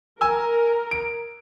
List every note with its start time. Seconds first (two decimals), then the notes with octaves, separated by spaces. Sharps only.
0.21 A#4 G#5 E6
0.91 D7